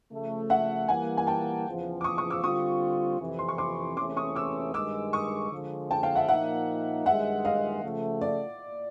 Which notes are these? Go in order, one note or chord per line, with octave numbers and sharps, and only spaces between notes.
C#3 F3 A3
E5 F#5
E3 G3 A#3 F#5 G#5
G#5
G5 A5
E2 C#3 F3
D6
C#6 D#6
C#6 D#6
D6 E6
D3 G3 C4 F4 C#6 D#6
F2 C3 E3
C6
C#6
C6 D6
E2 C3 E3 A3 C#4 C6 D6
C#6 D#6
D6 E6
G2 D#3 G#3 D6 E6
C#6 D#6
D3 F3 G#3
G5 A5
F5 G5
E5 F#5
A#2 F3 A#3 D#4 E5 F#5
G2 D#3 G#3 E5 F#5
D#5 F5
C#3 F3 A3
D5